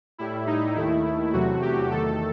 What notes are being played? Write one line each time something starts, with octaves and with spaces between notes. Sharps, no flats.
A2 G3 E4
D#4
D#2 D#3 A3 E4
E2 C3 F#3 A3 F#4
G4
E2 D#3 A3 A4